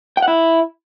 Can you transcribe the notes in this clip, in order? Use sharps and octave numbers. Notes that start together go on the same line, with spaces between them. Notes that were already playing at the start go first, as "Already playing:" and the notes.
G5
F#5
E4